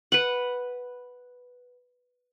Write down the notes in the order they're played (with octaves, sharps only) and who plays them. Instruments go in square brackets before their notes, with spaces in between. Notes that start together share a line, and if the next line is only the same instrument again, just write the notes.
[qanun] B4 F#5